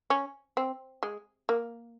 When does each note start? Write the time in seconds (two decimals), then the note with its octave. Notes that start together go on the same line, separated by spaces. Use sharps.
0.10 C#4
0.57 C4
1.03 G#3
1.49 A#3